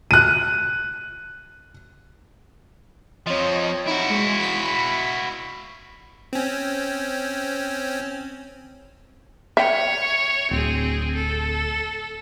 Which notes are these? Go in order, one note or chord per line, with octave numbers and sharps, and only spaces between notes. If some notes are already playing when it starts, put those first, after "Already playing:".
F#6 D#7
F2 F3 C#5 D#5
D#4 E4 F#4
G#3
B5 B6
C4 C#4
C#5 E5 G5
D1 C4 G#4
A4